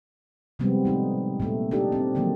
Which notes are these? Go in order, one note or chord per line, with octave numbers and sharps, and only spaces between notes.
C3 F3 G3 G#3 B3 C4
A3 D#4
A#2 A3
D4 D#4 G4 A4
C4
D3 F3 F#3 A#3